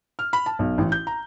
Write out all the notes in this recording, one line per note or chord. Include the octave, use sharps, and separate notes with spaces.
F6
B5
A5
B1
A1
G6
A#5